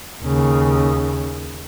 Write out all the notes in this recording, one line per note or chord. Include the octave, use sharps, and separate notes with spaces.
D#2 C#3